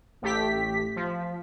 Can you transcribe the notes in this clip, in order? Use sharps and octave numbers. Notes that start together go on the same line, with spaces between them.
A1 A3 G4 B6
F3